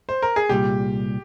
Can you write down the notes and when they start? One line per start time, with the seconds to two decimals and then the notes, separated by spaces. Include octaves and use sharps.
0.09 C5
0.22 A#4
0.36 G#4
0.49 C2 A#2 G3 G4